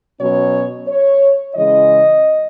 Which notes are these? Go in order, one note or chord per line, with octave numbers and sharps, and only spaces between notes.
B2 F#3 C#4 C#5
C#5
C#3 E3 G#3 D#5